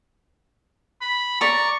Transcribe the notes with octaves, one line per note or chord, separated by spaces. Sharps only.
B5
D5 A#5 C#6